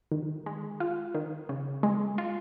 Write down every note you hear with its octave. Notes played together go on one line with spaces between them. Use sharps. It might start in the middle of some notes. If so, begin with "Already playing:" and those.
D#3
G#3
F4
D#3
C#3
G#3
F4